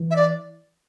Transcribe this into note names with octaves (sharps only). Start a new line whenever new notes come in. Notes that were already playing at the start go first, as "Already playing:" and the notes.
Already playing: E3
E5
D5